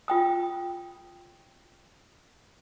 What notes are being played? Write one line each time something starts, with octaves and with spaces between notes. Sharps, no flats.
F4 G5 D#6